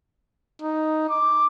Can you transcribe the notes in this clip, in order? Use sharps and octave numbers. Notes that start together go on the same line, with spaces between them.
D#4
D6